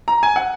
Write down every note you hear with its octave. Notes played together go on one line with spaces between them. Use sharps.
A#5
G#5
F#5